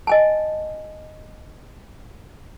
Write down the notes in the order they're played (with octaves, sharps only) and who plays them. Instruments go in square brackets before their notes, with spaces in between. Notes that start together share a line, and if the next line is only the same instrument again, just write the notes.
[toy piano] D#5 G#5 A5